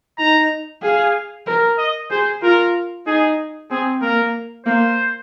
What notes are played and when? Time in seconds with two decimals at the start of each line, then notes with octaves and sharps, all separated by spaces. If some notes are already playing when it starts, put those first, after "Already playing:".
0.18 D#4 A#5
0.82 G#4 F5
1.46 A#4
1.78 D#5
2.10 G#4 C5
2.42 F4 A#4
3.06 D#4 G#4
3.70 C4 G#4
4.01 A#3 A#4
4.66 A#3 C5